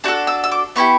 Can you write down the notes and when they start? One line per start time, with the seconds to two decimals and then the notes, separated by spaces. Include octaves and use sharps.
0.04 D4 F#4 A4 F#6
0.27 E6
0.44 E6
0.52 D6
0.76 B3 E4 G4 C#6